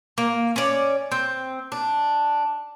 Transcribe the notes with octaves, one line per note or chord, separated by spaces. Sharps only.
A#3
C#4 D5
C4
D4